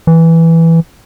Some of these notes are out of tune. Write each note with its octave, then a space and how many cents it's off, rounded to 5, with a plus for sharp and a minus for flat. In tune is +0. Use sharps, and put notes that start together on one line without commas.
E3 +0